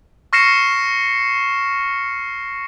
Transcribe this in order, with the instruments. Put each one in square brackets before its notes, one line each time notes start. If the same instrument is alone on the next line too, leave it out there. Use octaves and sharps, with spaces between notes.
[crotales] C#6 F6 A#6 C7 C#7 E7